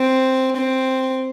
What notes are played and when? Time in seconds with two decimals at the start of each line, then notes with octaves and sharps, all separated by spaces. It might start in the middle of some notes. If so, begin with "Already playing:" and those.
Already playing: C4
0.56 C4